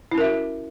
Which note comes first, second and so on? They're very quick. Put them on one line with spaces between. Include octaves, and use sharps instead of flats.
E4 C#4 A#4 E5 F#4